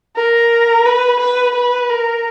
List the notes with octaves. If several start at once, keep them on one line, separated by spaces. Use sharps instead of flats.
A#4
B4
B4
B4
A#4